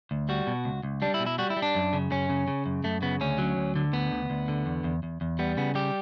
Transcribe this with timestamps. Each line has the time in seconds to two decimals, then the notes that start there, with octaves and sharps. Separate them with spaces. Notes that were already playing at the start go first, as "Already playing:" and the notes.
0.11 D2
0.29 G3 F#4
0.47 B2
0.65 C#2
0.83 C#2
1.02 G3 D4
1.14 E4
1.20 B2
1.26 E4
1.38 G3 F#4
1.50 E4
1.56 G3
1.62 D4
1.75 F#2
1.93 C#3
2.11 F#2 C#4
2.29 C#3
2.48 C#3
2.66 F#2
2.84 F#2 A3
3.02 C#3 B3
3.21 D2 C#4
3.38 F#3
3.57 D2
3.76 D3
3.93 D2 B3
4.11 D2
4.30 D2
4.48 D3
4.66 E2
4.84 E2
5.03 E2
5.21 E2
5.39 G3 B3
5.57 C#3 B3
5.75 G3 G4